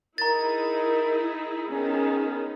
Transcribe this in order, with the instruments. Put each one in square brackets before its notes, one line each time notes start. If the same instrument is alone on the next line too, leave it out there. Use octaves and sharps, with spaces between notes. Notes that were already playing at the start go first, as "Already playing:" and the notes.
[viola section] D#4 E4 G#4 [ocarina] A#4 [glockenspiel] A#5 A6
[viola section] D#3 B3 D#4 [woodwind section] C#4 [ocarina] G#4